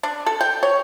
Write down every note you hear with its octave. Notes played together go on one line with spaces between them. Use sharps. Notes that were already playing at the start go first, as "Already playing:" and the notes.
D4
A4
G5
C#5